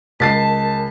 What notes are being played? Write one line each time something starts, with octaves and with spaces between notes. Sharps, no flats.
C#2 A#4 A5 A6 B6 C7